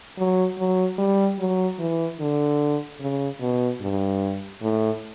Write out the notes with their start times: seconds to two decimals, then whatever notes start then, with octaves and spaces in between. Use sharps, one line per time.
0.18 F#3
0.59 F#3
0.98 G3
1.39 F#3
1.79 E3
2.20 D3
3.00 C#3
3.41 B2
3.81 G2
4.62 A2